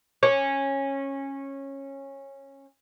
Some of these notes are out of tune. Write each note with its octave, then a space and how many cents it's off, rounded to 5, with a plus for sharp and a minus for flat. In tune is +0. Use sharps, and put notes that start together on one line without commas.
C#4 -15